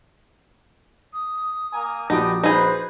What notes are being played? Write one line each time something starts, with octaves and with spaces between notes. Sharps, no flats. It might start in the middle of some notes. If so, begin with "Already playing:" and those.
D#6
A#3 G#5 A#5
A#1 B3 D4 D#4 F#4 G4 D#6 D7
D#4 G#4 B4 C5